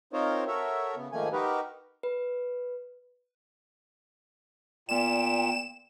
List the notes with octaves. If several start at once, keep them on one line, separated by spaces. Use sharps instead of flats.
C4 D#4 F4 A#4 C5 C#5
F#4 A4 A#4 C#5 E5
C#3 B3
G#2 D#3 F3 A3 A#3 G#5
D#4 F#4 G4 A#4 B4
B4
A#2 B3 D5 G5 E7